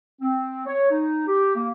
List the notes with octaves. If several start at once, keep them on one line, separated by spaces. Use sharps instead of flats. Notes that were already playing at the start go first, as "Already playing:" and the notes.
C4
C#5
D#4
G4
A#3